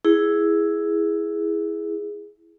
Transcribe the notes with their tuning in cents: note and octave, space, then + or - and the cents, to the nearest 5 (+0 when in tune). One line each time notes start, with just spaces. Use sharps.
E4 +0 G#4 +0